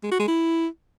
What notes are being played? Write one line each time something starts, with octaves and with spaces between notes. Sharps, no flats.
G#3
F#4
G#3
E4